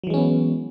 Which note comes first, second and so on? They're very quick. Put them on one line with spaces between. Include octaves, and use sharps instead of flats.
F#3 E3 G#3 C#4 B3